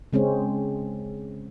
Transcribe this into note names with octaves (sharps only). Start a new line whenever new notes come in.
C#3 G#3 C4 C#4